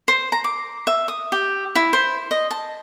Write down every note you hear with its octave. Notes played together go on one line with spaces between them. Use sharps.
C5
A#5
D6
E5
D#6
G4
E4
C5
D#5
A5